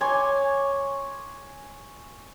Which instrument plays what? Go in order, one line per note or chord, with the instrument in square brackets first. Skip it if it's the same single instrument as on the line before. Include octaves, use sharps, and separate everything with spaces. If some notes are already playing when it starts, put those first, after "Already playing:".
[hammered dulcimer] C#5 G#5 C6 D6